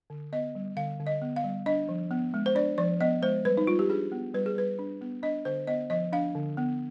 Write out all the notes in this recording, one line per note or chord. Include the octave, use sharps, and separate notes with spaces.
D3
B3 D#5
G3
D3 F5
D3
D#5
B3
F5
G3
D4 D#5
F3
B3
G#3
C5
D4 D5
F3 D5
B3 D#5
G#3 C5
G3 B4
D#4
G3 F4
G4
D4 G#4
B3
G3 B4
G#4
G3 B4
D4
B3
D4 D#5
D3 C5
B3 D#5
F3 D#5
D4 F5
D3
B3